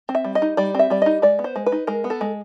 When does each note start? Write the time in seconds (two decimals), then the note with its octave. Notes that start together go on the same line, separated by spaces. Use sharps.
0.09 C4
0.15 E5
0.24 G3
0.35 D#5
0.42 D#4
0.57 G3 D5
0.75 C4 E5
0.90 G3 D5
1.02 D#4 D#5
1.22 G#3 D5
1.39 B3
1.44 C5
1.56 G#3
1.66 B4
1.72 D#4
1.87 G#3 A#4
2.04 B3
2.10 A4
2.21 G#3